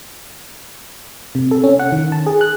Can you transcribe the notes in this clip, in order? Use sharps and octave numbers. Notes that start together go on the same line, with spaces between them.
C3
A4
C#4
F#5
D#3
A5
G#4
F#6